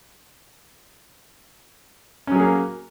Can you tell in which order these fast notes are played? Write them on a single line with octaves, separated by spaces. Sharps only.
C#4 F#3 G#4 A#3